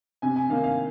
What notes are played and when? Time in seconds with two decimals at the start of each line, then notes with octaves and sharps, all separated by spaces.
0.22 C3 G#5
0.36 G#5
0.49 D#3 A#3 F5
0.64 F5